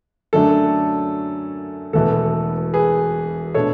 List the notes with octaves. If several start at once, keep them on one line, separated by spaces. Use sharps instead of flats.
F#2 D3 F#3 A3 D4 A4
E1 E2 B2 A3 A4
G#4 B4
B2 A3 D4 A4 C#5